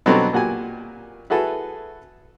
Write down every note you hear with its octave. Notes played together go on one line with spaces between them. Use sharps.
B2 D3 F#3 G3 C4 D4
A#2 F#4 G4 G#5
E4 F#4 G#4 A4 B4